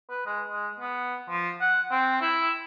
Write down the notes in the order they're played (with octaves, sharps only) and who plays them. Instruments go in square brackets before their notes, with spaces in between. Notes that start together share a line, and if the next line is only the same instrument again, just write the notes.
[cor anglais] B4
G#3
G#3
B3
F3
F#5
C4
E4